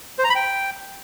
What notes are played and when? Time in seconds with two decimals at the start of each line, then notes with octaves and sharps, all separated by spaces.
0.19 C5
0.24 A#5
0.30 B5
0.35 G5